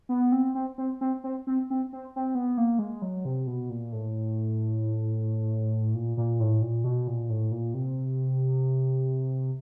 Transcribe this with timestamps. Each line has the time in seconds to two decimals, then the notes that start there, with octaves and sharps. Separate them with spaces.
0.09 B3
0.32 C4
0.55 C4
0.78 C4
1.01 C4
1.24 C4
1.47 C4
1.70 C4
1.93 C4
2.16 C4
2.35 B3
2.57 A#3
2.79 G#3
3.02 F#3
3.25 C3
3.47 B2
3.70 A#2
3.92 A2
5.95 A#2
6.17 A#2
6.40 A2
6.62 A#2
6.84 B2
7.08 A#2
7.29 A2
7.52 A#2
7.74 C3